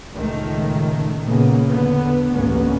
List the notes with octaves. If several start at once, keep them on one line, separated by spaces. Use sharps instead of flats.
C#2 A#2 D#3 A3
A#2 C#3 A#3 B3
E2 D3 B3
A1 D2 G#2 A#3 B3 C#4